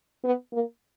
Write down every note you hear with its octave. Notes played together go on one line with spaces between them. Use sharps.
B3
A#3